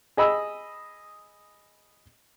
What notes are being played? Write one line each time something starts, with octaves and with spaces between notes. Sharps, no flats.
G#4 D#5 B5 E6